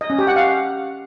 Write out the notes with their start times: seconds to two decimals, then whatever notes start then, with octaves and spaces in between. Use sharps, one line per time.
0.01 D#5
0.10 C#4
0.19 G4
0.27 F#5
0.36 F5